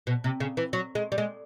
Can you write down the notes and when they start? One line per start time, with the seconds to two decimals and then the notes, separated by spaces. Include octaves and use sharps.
0.07 B2
0.24 C3
0.40 C#3
0.57 E3
0.73 F#3
0.95 G#3
1.12 G3
1.18 G#3